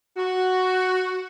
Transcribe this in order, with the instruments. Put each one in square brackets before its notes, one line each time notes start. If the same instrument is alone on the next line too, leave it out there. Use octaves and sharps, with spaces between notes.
[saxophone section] F#4